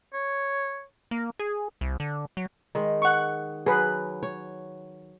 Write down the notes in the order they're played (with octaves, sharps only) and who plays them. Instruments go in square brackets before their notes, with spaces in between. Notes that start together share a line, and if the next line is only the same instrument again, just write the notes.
[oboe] C#5
[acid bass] A#3
G#4
C2
D3
F#3
[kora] D#3 G#3
[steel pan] F#5 C#6
[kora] F#3 [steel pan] G#4 B4
[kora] C#5